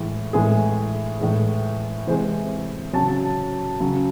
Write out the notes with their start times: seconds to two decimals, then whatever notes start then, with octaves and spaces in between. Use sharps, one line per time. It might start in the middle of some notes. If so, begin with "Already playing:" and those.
Already playing: A2 E3 G#3
0.33 A2 E3 G#3 G#4
1.20 A2 E3 G#3
2.06 C3 E3 G#3 C5
2.93 C#3 F#3 A5
3.80 C#3 F#3